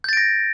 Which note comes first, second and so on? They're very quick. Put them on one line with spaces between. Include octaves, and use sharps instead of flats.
G6 A6 D7 A#6